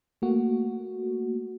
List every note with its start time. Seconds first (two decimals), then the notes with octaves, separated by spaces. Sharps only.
0.22 A3 A#3 F#4